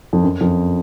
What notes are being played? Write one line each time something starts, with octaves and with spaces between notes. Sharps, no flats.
F2
F#2
F2